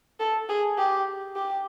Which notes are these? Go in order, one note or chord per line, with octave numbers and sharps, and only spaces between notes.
A4
G#4
G4
G4